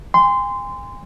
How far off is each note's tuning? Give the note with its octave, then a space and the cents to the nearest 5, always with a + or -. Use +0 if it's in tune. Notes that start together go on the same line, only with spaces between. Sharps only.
G#5 -40 C6 -20